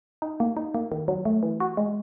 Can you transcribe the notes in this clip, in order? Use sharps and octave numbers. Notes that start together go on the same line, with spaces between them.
D#4
A#3
D#4
A#3
D#3
F#3
A3
E3
F#4
G#3